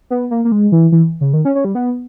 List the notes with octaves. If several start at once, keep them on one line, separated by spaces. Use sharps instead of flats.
B3
A#3
A#3
G#3
E3
E3
C#3
D#3
C#4
C#4
G3
B3